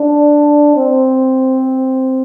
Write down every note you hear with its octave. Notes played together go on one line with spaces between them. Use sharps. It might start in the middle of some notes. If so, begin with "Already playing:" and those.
Already playing: D4
C4